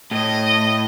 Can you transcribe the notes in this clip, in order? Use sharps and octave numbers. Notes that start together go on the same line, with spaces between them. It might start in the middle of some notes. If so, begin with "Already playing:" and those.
A2 D#5